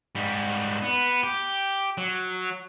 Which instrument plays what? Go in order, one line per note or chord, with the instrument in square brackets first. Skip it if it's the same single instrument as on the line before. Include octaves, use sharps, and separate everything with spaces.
[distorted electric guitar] G#2 G3
B3
G4
F#3